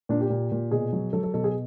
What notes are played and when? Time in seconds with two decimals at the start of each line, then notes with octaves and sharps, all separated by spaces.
0.09 A#2 D4
0.21 G4
0.30 A#2
0.52 A#2
0.71 B2 G#4
0.93 F#3
1.13 F#3 A4
1.24 A4
1.34 B2 A4
1.44 G#4